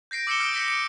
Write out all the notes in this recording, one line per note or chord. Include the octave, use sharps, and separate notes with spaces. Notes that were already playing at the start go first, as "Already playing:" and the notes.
G6 A#6 C7 D7
D6 E6 C7 C#7 E7 G7
D#6 F6 G6 C7 D7
G6 A#6 B6 C#7
C#7 D7